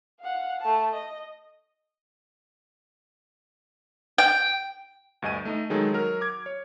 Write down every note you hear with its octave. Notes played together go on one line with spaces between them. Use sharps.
F5 F#5
A3 A5
D#5
G5
D2 G2 D#5 G#5 D#7
A3 D#4 D#5
D#3 F#3 G#3 D#4 G#4 A4
F#3 A#4 F6
D6 G#6
C#5